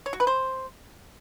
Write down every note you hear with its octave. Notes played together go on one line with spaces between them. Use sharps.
C#5
F#4
B4
C5